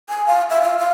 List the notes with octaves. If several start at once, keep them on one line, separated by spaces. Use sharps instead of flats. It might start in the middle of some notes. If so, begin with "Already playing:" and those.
G#5
F5
E5
F5
F5